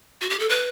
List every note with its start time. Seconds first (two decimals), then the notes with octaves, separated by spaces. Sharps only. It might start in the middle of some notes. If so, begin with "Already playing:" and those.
0.21 F#4
0.30 G4
0.39 A4
0.49 B4